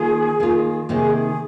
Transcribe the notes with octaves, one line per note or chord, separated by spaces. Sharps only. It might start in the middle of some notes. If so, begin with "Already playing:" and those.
Already playing: D#3 A#3 F4 G#4
D#3 A#3 F4
C3 D#3 A#3 D#4 G#4
G#4